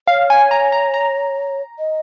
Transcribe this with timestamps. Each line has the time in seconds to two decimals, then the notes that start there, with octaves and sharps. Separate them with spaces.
0.07 C#5 F5
0.30 G#5
0.51 A#5
0.72 A#5
0.94 A#5
1.79 D#5